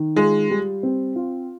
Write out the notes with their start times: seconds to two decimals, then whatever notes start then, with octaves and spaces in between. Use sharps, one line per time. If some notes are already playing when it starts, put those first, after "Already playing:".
Already playing: D#3
0.16 G#3 F4
0.50 G3
0.83 C4
1.16 F4